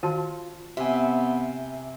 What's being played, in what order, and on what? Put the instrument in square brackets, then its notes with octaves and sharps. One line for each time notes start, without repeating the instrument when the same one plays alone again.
[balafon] D#3 F#4 A5 [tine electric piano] F4
[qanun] C3 [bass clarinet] B3 [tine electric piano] E5 G#5